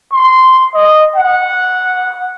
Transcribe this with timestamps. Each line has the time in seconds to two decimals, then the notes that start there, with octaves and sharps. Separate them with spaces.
0.12 C6
0.74 D#5
1.16 F#5